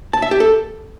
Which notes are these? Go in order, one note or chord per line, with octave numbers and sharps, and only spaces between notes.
A5
E5
G4
A4